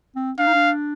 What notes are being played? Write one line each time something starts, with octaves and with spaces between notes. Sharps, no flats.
C4
D4 F5
D#4
D4